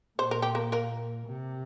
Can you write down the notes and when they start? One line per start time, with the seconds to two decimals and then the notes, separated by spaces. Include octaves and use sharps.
0.19 A#2 C5
0.31 A#4
0.42 G4
0.55 A#3 A#4
0.72 A#3 A#4
1.27 C3